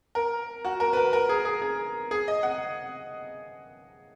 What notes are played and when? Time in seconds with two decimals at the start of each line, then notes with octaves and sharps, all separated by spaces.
0.15 A#4
0.65 F#4
0.80 A#4
0.93 B4
0.97 A#4
1.13 A#4
1.29 G#4
1.45 G#4
1.62 G#4
2.11 G#4
2.28 D#5
2.43 F#5